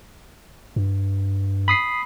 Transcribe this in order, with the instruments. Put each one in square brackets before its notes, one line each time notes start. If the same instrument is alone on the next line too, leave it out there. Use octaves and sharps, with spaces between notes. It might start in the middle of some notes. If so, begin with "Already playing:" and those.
[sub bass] G2
[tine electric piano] B5 D#6 C7